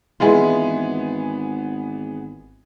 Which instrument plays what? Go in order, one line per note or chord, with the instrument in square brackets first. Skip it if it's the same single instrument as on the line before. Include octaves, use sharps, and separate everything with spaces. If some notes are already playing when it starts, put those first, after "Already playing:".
[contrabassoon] G#1 [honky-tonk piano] E3 B3 G#4 [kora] G#3 E4 F4